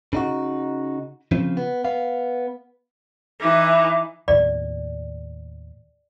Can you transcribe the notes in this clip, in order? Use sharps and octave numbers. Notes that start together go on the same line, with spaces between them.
C#3 D#4 F#4
C#3 F3 C4
B3
B3 F5
E3 D#4 E4 E5 D6
D#2 A2 D#3 D5